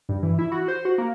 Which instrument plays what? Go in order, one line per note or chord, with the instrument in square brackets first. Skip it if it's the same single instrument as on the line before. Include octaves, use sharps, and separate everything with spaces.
[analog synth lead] G2
E3
E4
F#4
C5
F#4
A#3